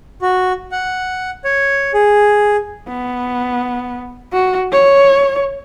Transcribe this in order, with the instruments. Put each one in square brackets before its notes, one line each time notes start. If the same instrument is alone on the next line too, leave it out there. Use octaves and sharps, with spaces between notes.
[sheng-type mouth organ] F#4
F#5
C#5
G#4
[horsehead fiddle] B3
F#4
C#5